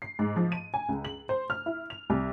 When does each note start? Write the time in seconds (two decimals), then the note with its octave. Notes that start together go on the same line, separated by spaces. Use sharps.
0.02 C7
0.19 G#2
0.36 F3
0.52 D#7
0.74 G#5
0.89 C#2
1.05 F#7
1.29 C5
1.50 F6
1.66 E4
1.90 F7
2.10 C2